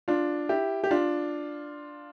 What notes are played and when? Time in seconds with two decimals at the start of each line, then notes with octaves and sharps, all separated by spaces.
0.08 D4 F4
0.49 E4 G4
0.84 G4
0.91 D4 F4